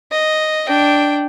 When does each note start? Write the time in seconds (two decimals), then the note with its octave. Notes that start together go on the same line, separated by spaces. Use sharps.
0.12 D#5
0.68 D4 G5